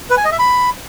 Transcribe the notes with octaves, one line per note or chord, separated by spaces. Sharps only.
B4
G#5
D#5
E5
B5